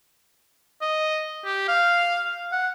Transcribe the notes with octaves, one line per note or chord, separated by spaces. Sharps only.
D#5
G4
F5
F#5